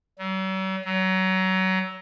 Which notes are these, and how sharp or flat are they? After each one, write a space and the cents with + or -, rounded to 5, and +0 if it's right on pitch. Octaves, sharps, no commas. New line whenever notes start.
F#3 +45
F#3 +25